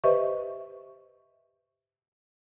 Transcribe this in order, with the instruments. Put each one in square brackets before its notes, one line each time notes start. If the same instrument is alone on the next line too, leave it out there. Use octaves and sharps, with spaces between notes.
[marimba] G4 B4 C5 D#5 E5 C#6